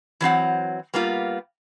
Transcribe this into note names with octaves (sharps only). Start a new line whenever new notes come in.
E3 F#3 C4 F#5
G3 A#3 B3 F4